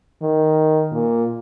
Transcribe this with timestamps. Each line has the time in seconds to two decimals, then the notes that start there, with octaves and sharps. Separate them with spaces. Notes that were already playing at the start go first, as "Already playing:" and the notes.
0.22 D#3
0.92 A#2